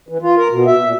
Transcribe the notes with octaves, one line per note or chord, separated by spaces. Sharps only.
E3
F4
A#4
B2
E5
A#2